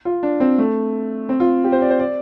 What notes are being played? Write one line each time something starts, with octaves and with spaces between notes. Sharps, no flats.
F4
D4
C4
A3
C4
F4
G4
C5
D5
C5
D5